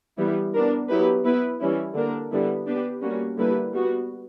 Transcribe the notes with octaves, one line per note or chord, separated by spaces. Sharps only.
E3 G3 B3 E4
B3 D4 A#4
F#3 B3 E4 G4 B4
B3 E4 B4
E3 G3 C#4 E4
D3 A#3 D4 A#4
D3 G3 B3 E4
B3 D4 G4 B4
G3 A#3 C#4 F#4
D3 G3 A#3 E4 B4
G3 B3 F#4